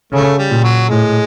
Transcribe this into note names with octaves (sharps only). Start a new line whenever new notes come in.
C#3 A3
G3
A#2
F#3
A2 G#3